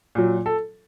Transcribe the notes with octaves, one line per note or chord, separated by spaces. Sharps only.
A#2 F#3
A4